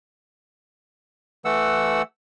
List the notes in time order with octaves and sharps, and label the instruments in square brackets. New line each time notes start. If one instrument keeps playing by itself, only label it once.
[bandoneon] E3 A3 F#5 E6